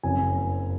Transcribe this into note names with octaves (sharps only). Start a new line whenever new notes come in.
F#1 F2 C#3 G#5